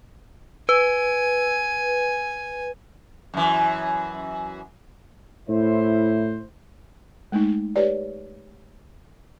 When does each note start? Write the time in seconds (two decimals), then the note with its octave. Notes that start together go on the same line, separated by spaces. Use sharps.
0.69 B4 G#5
3.34 F#2 E3
5.50 A2 E4 C5
7.32 G#3 A3 D#4
7.76 G4 B4 C#5 D5